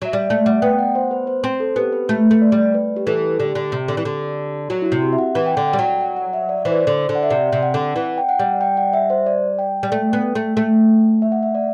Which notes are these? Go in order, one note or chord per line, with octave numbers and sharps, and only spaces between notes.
F#3 E5
G3 D5
A3 E5
G3 F#5
B3 G5
F#5
C5
B4
C5
C4 C5
A4
B3 G4
B4
A3 B4
A3
D5
G3
B4
G4
E3 A4
D3 G4
D3
C3
D3
E3
D3
F#3 F#4
E4
F#4
C3
G4
E5
F#5
E3
G5
D3 F#5
G5
G3
F#3
F#5
F#5
E5
D5
E3 C5
D5
C5
D3
D5
D3
F#5
E5
C3 D5
C3
F#5
D3
E3 F#5
G5
F#5
G3
G5
F#5
E5
C5
D5
G5
G3
A3
B3
A3
A3
E5
F#5
E5
D5